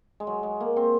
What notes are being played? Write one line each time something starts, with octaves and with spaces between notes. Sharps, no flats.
G#3
F#3
G#3
A#3
C4